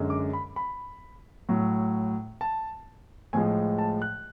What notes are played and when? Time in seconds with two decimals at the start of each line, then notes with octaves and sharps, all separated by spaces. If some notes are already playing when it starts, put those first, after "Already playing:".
Already playing: F#2 D3 G#3
0.10 D6
0.33 B5
0.56 B5
1.49 A2 F#3
2.41 A5
3.33 A2 F3 G#3 G#5
3.79 A5
4.02 F#6